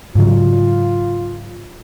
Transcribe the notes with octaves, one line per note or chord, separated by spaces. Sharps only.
G#2 C#3 F#3 F4